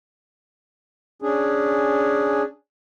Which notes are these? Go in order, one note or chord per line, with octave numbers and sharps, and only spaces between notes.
C#4 D4 G#4